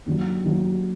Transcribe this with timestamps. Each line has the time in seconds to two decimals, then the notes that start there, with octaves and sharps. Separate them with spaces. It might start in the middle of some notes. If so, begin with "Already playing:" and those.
0.06 D#2 D3 F#3
0.43 D#2 D3 F#3